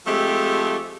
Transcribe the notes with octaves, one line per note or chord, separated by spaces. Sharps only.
F3 G#3 A3 C4 G4